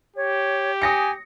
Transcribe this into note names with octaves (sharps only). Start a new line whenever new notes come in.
G4 C#5
G#5 D#6 A#6 C#7